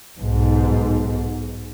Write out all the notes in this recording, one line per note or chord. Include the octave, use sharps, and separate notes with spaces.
B1 G#2